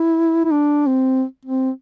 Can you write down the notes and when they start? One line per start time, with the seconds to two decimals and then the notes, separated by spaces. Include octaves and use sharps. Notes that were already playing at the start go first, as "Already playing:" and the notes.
Already playing: E4
0.45 E4
0.51 D4
0.87 C4
1.45 C4